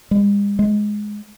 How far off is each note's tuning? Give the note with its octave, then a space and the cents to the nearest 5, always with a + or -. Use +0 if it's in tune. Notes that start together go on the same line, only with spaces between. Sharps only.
G#3 -45
G#3 +10